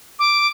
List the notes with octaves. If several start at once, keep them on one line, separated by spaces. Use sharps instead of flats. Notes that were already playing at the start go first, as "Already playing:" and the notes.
D6